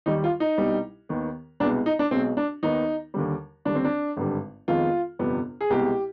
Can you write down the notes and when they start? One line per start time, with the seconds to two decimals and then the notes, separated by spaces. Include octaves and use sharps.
0.06 D#2 D#3 G3 D#4
0.24 F4
0.40 D#4
0.58 C2 B2 G3
1.09 D#2 D#3 B3
1.60 C2 B2 G#3 B3 D4
1.86 D#4
1.99 D4
2.11 B1 B2 G#3 C4
2.37 D4
2.63 D#2 D#3 B3 D#4
3.14 D#2 D3 G3
3.65 D#2 D3 G3 D4
3.75 C4
3.84 D4
4.17 G#1 G2 D3 G3
4.68 F2 D#3 G#3 B3 F4
5.19 G1 F2 C3 G3 B3
5.61 G#4
5.70 C2 B2 G#3 G4